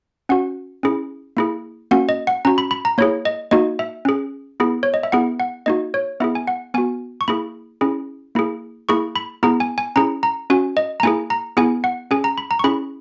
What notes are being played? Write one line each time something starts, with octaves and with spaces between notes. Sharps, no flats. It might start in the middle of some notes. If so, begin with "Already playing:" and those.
C#4 F#4 F#5
C#4 E4 G#4
A#3 E4 G#4
A#3 C#4 F#4 F#5
D#5
F#5
C#4 F#4 A#5
B5
B5
A#5
A#3 E4 G#4 C#5
D#5
A#3 D#4 F#4 D#5
E5
C#4 G#4
B3 E4 G#4
C#5
D#5
E5
B3 E4 G#4 F#5
F#5
A#3 D#4 F#4 D#5
C#5
B3 E4 G#4 E5
G#5
F#5
B3 F#4 G#5
C#6
A#3 E4 G#4 B5
C#4 E4 G#4
A#3 E4 G#4
A#3 E4 G#4 C#6
B5
B3 E4 G#4 A#5
G#5
G#5
C#4 E4 G#4 A#5
A#5
C#4 F#4 G#5
D#5
A#5
A#3 E4 G#4 G#5
A#5
B3 E4 G#4 G#5
F#5
C#4 G#4 G#5
A#5
B5
A#5
C#6
C#4 E4 G#4 B5